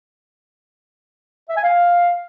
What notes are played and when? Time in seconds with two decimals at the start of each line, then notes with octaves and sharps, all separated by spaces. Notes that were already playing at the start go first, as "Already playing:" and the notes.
1.49 E5
1.56 G#5
1.63 F5